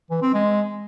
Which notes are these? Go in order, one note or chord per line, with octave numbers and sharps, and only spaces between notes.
E3
C4
G#3